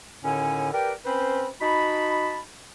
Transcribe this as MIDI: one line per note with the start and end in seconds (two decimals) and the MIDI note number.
0.24 0.70 39
0.24 0.70 45
0.24 0.70 50
0.24 0.70 61
0.24 0.70 80
0.73 0.93 67
0.73 0.93 70
0.73 0.93 71
0.73 0.93 74
0.73 0.93 79
1.06 1.48 60
1.06 1.48 61
1.06 1.48 71
1.06 1.48 72
1.06 1.48 83
1.61 2.39 63
1.61 2.39 66
1.61 2.39 81
1.61 2.39 83